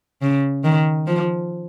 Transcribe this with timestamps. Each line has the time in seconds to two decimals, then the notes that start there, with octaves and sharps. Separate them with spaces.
0.22 C#3
0.64 D#3
1.07 F3